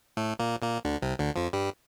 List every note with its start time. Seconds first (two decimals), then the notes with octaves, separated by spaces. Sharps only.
0.17 A2 A3
0.39 A#2 A#3
0.62 A#2 A#3
0.85 D2 D3
1.02 C2 C3
1.19 D2 D3
1.36 F2 F3
1.53 G2 G3